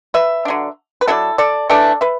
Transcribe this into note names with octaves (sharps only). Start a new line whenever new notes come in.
B4 E5
D4
D3 F#3
B4
D3 F#3 D4 E4 A4
A4 D5
E3 A3 D4 A4 D5
B4 E5